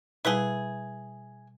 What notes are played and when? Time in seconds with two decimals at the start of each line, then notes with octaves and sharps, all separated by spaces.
0.25 B2 G3 E4 G#4 B4 A5 B6 G7